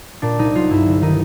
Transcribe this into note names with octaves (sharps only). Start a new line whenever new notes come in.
A#2 D4
C2 D#4
F#3 F4
G2 E4
G1
D#3 D#4